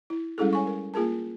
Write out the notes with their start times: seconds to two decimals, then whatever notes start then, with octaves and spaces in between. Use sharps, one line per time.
0.10 E4
0.38 G3 G#3 C#4 E4 G#4 A4
0.53 C#5 G#5 C#6
0.67 A#4
0.94 A#3 F4 G#4 A#4 A5